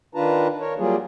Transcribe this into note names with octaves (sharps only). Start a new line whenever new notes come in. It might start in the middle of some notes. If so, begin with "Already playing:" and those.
D#3 D4 F4 B4 A5 A#5
A#4 C#5
F#3 G3 A#3 F4 G#4